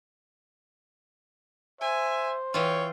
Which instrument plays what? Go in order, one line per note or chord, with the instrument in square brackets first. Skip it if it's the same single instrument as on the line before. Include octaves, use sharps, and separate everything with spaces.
[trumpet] C5 [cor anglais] E5 [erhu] G#5
[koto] E3 F4 [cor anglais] C#5 [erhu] G5